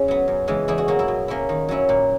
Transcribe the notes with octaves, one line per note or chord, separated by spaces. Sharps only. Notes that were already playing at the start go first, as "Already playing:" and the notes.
Already playing: C#4 E4 G#4
F#3 B3
F#2
C#3 E3 G#3
E2 E4 G#4
F#4
B2 F#3 A#3 F#4
E4
B2
A#3 C#4 E4
D#3
F#3 C#4 E4
A#2